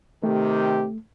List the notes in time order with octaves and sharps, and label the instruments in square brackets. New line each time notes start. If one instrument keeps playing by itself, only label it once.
[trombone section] C3 D#3 G4 [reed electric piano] A3